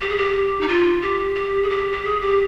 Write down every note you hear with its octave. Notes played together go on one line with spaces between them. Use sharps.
G4
G#4
G4
D#4
F4
G4
G4
G#4
G4
G4
G#4
G4